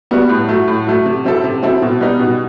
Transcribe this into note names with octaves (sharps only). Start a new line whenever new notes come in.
G3 B3 F#4
A2
F#3 A3
A2
F#3 A3
C3
F#3 C4 E4 A4
C3
F#3 C4 E4 A4
B2
G3 B3 D#4
B2